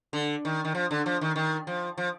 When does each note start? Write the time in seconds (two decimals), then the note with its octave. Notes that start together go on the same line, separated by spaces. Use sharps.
0.13 D3
0.45 D#3
0.65 D#3
0.75 F3
0.91 D3
1.06 F3
1.21 D#3
1.36 D#3
1.67 F3
1.98 F3